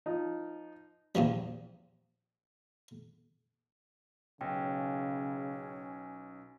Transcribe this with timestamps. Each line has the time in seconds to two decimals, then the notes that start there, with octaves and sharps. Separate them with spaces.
0.06 F3 D#4
1.15 E2 A#2 F3 G3
4.41 B1 C#3 C#4 G5